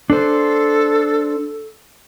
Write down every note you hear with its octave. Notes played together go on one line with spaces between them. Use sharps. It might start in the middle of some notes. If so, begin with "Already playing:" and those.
D4 A4 C5